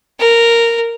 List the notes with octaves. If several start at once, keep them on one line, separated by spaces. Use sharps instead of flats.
A#4